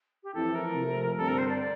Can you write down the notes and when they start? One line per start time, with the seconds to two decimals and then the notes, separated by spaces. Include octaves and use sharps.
0.23 G4
0.34 F2 E3 A3 C4 E4 A4
0.55 A#4
0.75 C3 F3 A3
1.17 G2 D3 G3 C4 A4
1.28 A#4
1.38 C5
1.49 D5